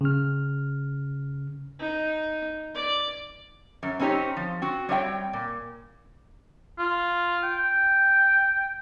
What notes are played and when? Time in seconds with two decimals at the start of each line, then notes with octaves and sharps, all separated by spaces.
0.01 C#3 F6
1.79 D#4
2.74 D5
3.83 F#2
4.00 C4 C#4 D#4 G4 C#5
4.37 F3
4.62 C4 F#4
4.89 G3 C4 C#5 F5 G5
5.33 A#2
6.79 F4
7.43 G5